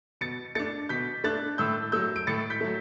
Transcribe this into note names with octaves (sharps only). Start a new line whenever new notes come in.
B2 A6 C#7
A3 D4 A6 C#7
B2 G6 B6
A3 D4 F#6 A6
A2 E6 G6
F#3 A3 E6 G6
D7
A2 A6 C#7
G6 B6
F#3 A3